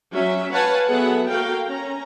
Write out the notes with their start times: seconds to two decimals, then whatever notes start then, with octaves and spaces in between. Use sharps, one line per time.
0.13 F#3 C#4 E5
0.52 B4 C#5 F5 F#5 G#5 A5
0.89 F#3 B3 G#4 A4 E5 F#5
1.29 A#3 F#4 A4 A#4 F5 G5
1.66 C#4 A#5